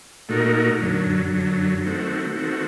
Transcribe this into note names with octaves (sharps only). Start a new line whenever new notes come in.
A#2 A3 D#4 F#4 A#4
F#2 D3 F#3
F#2 D3 F#3
D#3 A3 C4 F#4
D#3 A3 C4 F#4